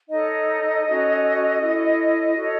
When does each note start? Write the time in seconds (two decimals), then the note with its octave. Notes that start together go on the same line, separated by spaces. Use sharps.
0.08 D#4 A4 C#5 D#5
0.85 C#4 F#4 A4 C#5
1.59 E4 A4 C#5
2.35 F#4 A4 C#5